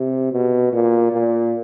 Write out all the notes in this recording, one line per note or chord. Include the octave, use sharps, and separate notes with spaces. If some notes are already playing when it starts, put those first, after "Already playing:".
Already playing: C3
B2
A#2
A#2